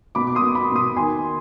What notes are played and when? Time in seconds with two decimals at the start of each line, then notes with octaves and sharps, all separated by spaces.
0.15 B2 B5 D6
0.27 D6
0.35 C6 D#6
0.42 B3
0.55 B5 D6
0.70 B2
0.76 C6 D#6
0.96 D#3 G#5 C6